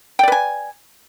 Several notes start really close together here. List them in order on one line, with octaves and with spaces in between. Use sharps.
G5 D5 B4 G#5